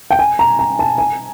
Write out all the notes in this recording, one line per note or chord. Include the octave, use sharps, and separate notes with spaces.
G5
G#5
A#5
A#5
A5
G#5